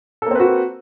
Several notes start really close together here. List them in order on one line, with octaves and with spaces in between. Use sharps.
A4 A#3 C4 B4 F#4